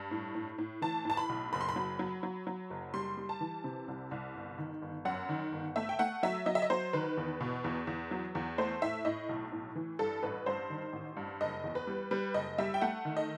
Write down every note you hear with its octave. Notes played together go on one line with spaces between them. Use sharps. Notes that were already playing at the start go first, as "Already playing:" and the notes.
Already playing: G2
A2
A2
A2
E3 A5
A2 A5
B5
B1
F#1 B5
C6
B5
F#3
F#3
F#3
F#3
F#1
G3 C6
G3
A5
E3
C3
C2
C2
G1
D#3
G1
F#2 F#5
D#3
G1
A3 E5
G5
A3 F#5
F#3 E5
F#3 D#5
E5
D#5
F#3 C5
D#3 B4
E2
B2
E2
E2
F#3
E2
A3 C5
A2 E5
A2 D#5
B1
A2
E3
G2 A4
A1 B4
G2 C5
D#3
A1
G2
F#1 D#5
E2
B4
G3
G3 B4
F#1 D#5
G3 E5
G5
A3 F#5
D#3
D#5